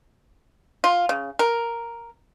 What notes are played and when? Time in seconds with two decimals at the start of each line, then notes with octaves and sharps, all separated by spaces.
0.84 F4
1.09 C#3
1.39 A#4